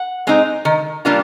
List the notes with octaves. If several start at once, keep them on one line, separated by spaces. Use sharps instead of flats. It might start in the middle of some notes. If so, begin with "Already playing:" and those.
Already playing: F#5
G#3 C4 D#4
D#3
G3 A#3 D4 F4